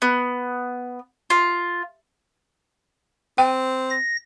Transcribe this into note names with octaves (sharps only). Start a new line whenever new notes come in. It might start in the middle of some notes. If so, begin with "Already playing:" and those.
B3
F4
C4 G5
A#6